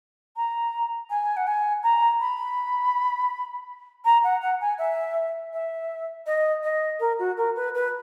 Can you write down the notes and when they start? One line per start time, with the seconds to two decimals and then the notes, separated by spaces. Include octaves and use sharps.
0.36 A#5
1.10 G#5
1.36 F#5
1.47 G#5
1.83 A#5
2.20 B5
4.04 A#5
4.23 F#5
4.41 F#5
4.60 G#5
4.78 E5
5.53 E5
6.26 D#5
6.63 D#5
6.99 A#4
7.19 F#4
7.37 A#4
7.56 B4
7.74 B4